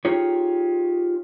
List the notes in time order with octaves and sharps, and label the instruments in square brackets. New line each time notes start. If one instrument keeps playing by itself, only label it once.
[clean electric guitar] D#4 F4 G4 G#4 C#5